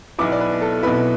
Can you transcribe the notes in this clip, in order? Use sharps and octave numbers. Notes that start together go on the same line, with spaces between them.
B1 B2 B3 E4 D6
D5
B4
A4
B1 B2 B3 E4 B4